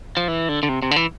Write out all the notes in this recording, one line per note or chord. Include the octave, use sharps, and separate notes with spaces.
F3
E3
D3
D3
C3
C3
D3
E3